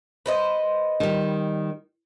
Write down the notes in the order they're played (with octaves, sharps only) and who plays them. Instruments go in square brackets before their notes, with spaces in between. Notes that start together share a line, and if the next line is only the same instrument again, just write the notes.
[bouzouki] B4 C5 D#5
[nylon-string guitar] D#3 G3